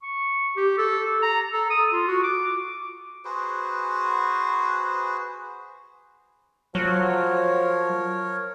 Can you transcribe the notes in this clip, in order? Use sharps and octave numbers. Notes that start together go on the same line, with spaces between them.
C#6
G4
A4
A#5
A4
D#6
F4
F#4
D6
F#4 G#4 B4 C5
F3 F#3 A#4 C#5